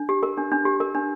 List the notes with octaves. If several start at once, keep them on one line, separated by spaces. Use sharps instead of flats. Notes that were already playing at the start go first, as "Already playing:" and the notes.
Already playing: D4
G4
A#4
D4
D4
G4
A#4
D4